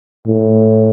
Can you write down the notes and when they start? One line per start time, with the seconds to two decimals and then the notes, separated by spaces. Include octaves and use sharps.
0.27 A2